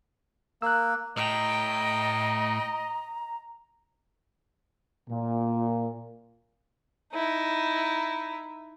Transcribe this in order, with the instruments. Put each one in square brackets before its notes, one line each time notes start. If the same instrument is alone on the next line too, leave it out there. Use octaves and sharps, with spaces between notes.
[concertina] A#3 [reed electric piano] E6 F#6
[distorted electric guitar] A2 [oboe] D#5 [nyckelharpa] G5 [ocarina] A#5
[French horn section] A#2
[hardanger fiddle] D#4 E4